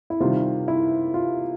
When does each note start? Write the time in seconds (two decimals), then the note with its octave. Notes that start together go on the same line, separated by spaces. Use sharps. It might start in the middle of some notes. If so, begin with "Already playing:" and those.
0.10 E4
0.20 C3 D#3 G3 F4
0.68 E4
1.14 F4